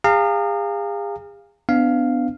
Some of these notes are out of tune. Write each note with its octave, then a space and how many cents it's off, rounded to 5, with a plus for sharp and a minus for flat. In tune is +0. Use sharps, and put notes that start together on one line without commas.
G#4 -40 F5 +0 A#5 -35
B3 +25 D4 +0 F5 +0